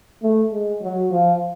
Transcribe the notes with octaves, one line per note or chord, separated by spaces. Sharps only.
A3
G#3
F#3
F3